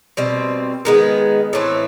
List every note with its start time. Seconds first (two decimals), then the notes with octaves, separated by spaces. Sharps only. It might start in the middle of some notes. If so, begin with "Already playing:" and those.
0.17 B2 G3 C4
0.85 D#3 G#3 B3
1.53 A2 E3 A3 C4